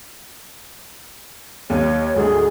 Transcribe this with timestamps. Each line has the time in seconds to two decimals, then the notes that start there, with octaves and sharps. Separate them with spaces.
1.70 D#2 C#5
2.16 D2 G#2 A3 G#4